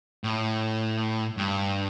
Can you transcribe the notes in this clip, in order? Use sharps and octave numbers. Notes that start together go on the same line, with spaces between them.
A2
G2